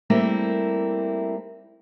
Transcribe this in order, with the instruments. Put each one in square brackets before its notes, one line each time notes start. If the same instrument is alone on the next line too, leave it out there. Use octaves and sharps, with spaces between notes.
[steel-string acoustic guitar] G3 A3 A#3 C4 E4 A#4